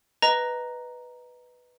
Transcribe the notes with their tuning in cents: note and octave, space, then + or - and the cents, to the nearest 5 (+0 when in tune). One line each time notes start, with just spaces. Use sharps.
B4 +0 D#5 +0 A#5 +0